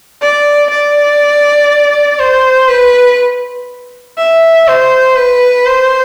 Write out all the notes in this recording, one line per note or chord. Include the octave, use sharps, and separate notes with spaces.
D5
D5
C5
B4
E5
C5
B4
C5